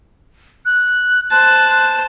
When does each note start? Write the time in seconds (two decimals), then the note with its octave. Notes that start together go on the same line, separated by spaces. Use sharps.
0.65 F#6
1.31 C5 A5 F#6